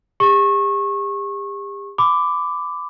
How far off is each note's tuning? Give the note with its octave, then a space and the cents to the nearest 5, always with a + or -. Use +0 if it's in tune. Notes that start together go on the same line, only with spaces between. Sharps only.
G4 +40 C#6 -25
B5 +25 D6 +0